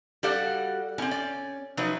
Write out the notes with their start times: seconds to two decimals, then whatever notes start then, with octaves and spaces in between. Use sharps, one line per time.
0.23 G3 F#4 G4 A4 F5 F#5
0.98 A2 C4 C#4
1.11 D5
1.77 F3 F#3 D#4 E4 B4